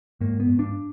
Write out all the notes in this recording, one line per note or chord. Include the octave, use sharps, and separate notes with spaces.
G#2 A#3
B3
G#2
D4